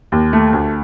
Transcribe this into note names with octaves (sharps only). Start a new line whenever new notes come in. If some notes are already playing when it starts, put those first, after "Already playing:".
D#2
A3
D2